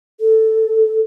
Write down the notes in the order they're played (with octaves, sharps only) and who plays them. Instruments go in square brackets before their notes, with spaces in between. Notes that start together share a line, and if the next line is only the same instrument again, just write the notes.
[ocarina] A4